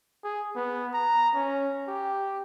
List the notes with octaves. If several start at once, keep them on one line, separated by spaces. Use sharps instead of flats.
G#4
B3
A#5
C#4
G4